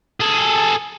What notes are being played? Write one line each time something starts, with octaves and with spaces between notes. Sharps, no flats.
G#4 A4